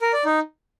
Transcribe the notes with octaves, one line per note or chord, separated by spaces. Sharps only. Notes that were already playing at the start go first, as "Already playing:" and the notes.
A#4
D5
D#4